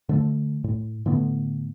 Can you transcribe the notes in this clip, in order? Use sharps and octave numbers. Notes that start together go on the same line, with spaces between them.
D3 F3 A3
A2
A2 D3 A3 B3